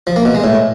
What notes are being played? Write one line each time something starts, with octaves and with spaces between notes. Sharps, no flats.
F3
A#3
B2
G#3
A2